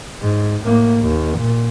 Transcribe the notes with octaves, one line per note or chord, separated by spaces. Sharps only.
G#2
A2 A#3
D#2
A#2